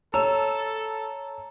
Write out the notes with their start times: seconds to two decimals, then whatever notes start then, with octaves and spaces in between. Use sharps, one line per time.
0.14 A4 C#5 A5 A#5 E6